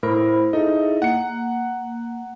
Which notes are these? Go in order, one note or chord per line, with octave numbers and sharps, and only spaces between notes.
A2 E4 A#4 C5 B5
D#4 E4 G#4 A4 D#5 E5
A#3 F#5 C#7